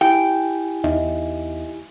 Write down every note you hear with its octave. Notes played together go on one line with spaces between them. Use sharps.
E4 G4 G5 G#5
E2 D#4 D#5 E5